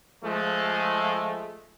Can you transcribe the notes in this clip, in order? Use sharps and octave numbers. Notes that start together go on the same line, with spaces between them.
F3 G#3 A3